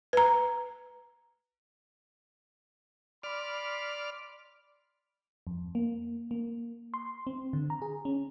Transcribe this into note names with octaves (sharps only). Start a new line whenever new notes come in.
B4 A#5
D5 B5 C6 F6
F2
A#3
A#3
C6
C4
D3
A#5
G#4
C#4